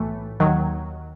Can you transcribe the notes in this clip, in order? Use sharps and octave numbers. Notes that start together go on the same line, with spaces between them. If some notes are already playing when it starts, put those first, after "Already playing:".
Already playing: B1 A2 E3 A3
D#2 D#3 F#3